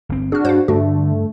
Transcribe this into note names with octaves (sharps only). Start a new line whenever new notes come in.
G1 C4
D4 F#4 G#4 F6
G2 C5 F5
G2 D3 A3 D4 F#4